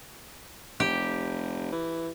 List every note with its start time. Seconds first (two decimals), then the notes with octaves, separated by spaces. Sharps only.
0.80 F1 G4
1.72 E3